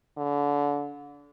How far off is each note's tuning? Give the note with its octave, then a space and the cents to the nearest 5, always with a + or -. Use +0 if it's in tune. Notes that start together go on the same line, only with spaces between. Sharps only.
D3 -30